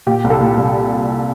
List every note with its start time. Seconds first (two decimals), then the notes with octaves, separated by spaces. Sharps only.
0.07 A#2 G4
0.24 C2
0.30 A4
0.40 A#2
0.57 C2